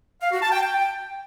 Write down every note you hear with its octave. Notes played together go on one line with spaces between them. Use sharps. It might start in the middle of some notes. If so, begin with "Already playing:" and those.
F5
F#4
A5
G5
G5